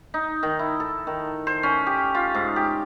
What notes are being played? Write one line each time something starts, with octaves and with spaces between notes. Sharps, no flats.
D#4
D#3
E4
A4
D#3
C5
C#4
G4
F4
G#2
G4